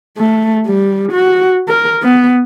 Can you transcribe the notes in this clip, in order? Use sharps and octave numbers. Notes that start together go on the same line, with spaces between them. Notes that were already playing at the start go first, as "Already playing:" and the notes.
A3
G3
F#4
A#4
B3